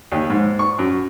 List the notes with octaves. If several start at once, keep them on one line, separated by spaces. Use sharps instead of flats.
D#2
G#2
C#6
F#2